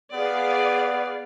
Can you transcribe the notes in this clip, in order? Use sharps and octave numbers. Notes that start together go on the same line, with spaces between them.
B3 G#4 D5 F5